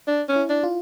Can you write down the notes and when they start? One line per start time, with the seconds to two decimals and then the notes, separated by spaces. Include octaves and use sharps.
0.07 D4
0.28 C#4
0.36 E4
0.49 D4
0.63 F4